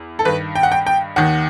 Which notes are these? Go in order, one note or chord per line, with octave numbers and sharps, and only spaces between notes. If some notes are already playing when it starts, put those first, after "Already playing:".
Already playing: E2
A4
G2 D#3 B4
G5
F#5
G5
G5
D#2 D#3 F#5